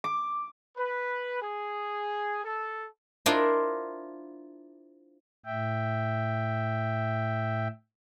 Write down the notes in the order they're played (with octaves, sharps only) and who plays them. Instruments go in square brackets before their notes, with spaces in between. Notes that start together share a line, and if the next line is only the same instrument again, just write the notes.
[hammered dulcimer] D6
[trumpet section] B4
G#4
A4
[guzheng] D4 E4 F4 A#4 C5 D#5
[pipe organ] A2 E5 G5